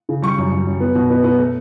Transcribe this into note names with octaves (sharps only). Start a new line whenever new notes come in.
C#3
G3 C#6
F#2
F#2
F#2
B3
B2
B3
B3
A3